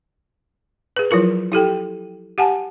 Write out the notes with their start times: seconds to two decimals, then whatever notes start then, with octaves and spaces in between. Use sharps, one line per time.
0.96 G#4 B4
1.11 F3 F#3 E4 F4 A#4
1.52 E4 G4 A4 G5
2.38 G4 F#5 G#5 A5